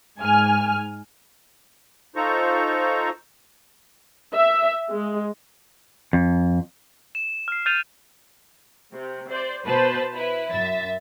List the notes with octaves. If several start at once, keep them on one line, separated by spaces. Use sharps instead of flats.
G#2 G#5 F6
D#4 F4 A4 C5 A#5 C#6
E5
G#3
F2
E7
F6 C7
F6 G6 A6 D#7 F7
C3
C5 D5
B2 B4 C5 A5
E4 B4
F#2 E5 A6